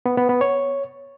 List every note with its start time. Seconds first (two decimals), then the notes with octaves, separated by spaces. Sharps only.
0.06 B3
0.17 B3
0.29 B3
0.41 C#5